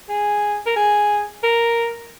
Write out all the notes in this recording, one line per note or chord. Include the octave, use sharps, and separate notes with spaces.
G#4
A#4
G#4
A#4